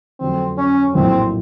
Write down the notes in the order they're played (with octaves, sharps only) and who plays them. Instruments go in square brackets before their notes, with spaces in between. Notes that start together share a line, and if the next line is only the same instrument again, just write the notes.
[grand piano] F2 D3 F#3 A3 [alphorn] C4
[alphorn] C#4
[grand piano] A#1 A2 F#3 A#3 [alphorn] C4